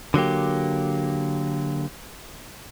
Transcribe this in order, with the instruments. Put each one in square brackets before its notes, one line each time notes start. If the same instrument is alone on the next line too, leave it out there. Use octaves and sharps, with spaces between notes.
[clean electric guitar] D3 F#3 A#3 G4